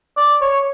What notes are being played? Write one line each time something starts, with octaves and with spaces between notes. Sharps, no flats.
D5
C#5